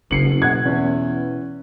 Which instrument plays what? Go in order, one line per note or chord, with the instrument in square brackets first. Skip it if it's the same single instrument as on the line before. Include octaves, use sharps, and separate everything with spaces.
[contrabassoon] F#1 [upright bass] C#3 B3 [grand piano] C7 C#7 F#7
[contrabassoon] F#1
[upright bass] B2 [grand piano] F#5 F#6 G#6
[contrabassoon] E2 [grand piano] C#4